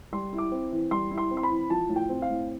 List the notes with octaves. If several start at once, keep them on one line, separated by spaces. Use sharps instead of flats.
G3 C6
E4
D6
C4
E3
G3 C6
E4
C6
C4
C6
B5
E3
F3 A5
A2
G5
C4
F5
A2